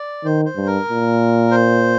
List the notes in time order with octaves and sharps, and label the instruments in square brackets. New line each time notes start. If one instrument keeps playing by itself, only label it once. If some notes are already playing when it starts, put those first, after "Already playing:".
Already playing: [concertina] D5
[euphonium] D#3 [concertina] C5
[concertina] C5
[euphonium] G2
[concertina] A#4
[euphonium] A#2
[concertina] C5